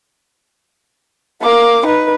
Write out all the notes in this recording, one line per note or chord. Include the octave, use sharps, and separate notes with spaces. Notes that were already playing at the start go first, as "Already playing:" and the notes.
A#3 D6
D#4 B4